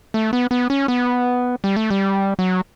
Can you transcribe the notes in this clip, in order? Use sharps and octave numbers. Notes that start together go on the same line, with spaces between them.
A3
B3
B3
C#4
B3
G3
A3
G3
F#3